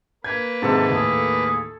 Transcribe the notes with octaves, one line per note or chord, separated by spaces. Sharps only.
A#3 B4 G#6
G#2 C3 D#3 A4 A5
D#2 A2 G#4